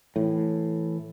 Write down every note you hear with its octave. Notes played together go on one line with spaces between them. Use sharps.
A2 E3